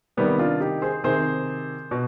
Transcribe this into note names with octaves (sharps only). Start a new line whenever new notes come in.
C3 D#3 G3 B3
D4 F4
D#4 G4
G#4 C5
C3 D#3 G#4 C5
B2